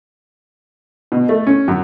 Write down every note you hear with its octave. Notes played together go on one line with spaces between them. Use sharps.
B2
A3
C#4
F#2